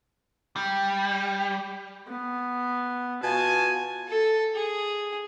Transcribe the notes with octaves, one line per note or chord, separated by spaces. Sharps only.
G3
B3
B2 F4 F#4 G#5 A5
A4
G#4